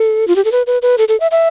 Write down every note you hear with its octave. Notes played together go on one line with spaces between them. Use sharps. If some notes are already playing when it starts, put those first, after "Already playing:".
Already playing: A4
F4
G4
A4
B4
B4
B4
A4
A4
E5
E5